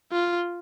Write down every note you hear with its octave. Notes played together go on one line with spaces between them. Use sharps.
F4